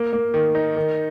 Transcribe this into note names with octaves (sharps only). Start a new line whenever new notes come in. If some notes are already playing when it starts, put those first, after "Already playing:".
Already playing: A#3
A#3
D#3
D#4
D#3